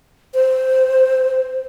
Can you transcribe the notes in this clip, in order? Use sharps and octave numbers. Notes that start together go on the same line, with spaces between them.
C5